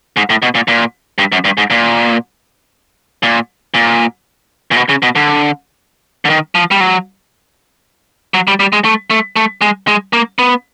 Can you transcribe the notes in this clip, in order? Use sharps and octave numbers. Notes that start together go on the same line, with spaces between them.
G#2
A2
B2
A#2
A#2
G2
F#2
G2
G#2
A#2
A#2
A#2
A#2
B2
C#3
B2
D3
D3
D#3
F3
G3
F#3
F#3
G3
G3
G#3
A3
A3
A3
G#3
G#3
A#3
B3